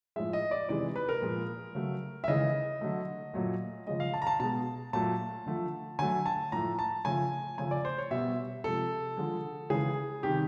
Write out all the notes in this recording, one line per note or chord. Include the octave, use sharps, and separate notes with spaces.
A2 F3 G#3 E5
D#5
D5
C3 E3 G#3 D5
B4
A#4
A#2 F3 G#3
C#3 F#3 A3
E5
C#3 E3 G#3 D#5
D3 F#3 A3
A#2 F#3 A3
C#3 F3 G#3 D#5
F5
A5
A#5
A5
B2 G#3 A5
A#2 F#3 A3 A5
D3 F3 A3
D3 F#3 A3 G#5
A5
A2 F3 A3 A#5
A5
C#3 F3 A3 G#5
C#3 F3 A3 G#5
D5
C5
C#5
B2 G3 E5
C3 F3 G#3 A4
D3 F3 G#3
C#3 E3 G#3 G#4
C3 D#3 G3 G4